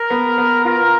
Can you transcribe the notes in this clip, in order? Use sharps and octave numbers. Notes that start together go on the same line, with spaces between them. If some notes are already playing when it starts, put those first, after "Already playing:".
Already playing: A#4
B3
B3
F4 A#4